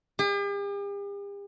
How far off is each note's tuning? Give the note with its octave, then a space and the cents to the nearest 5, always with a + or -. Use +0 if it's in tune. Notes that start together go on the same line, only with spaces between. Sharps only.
G4 +45